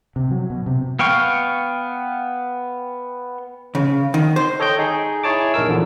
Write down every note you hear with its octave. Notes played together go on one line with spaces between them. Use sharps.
C3
F#3
B2
C3
B3 F5 G5 C#6
C#3
D#3
C5
A4 C#5 D#5 G5 G6
D#4 G#4
E4 G#4 C#5 A5 D6
A#1 D#4 A#4 E6
E2 D3 F3